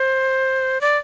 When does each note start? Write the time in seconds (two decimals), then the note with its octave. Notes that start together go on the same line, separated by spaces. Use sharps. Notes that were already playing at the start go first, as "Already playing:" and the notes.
Already playing: C5
0.81 D5